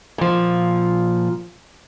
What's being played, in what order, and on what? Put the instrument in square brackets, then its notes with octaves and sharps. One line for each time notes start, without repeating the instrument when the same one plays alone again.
[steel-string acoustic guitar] A#2 F3